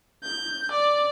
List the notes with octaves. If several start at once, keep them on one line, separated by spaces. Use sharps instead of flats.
G6
D5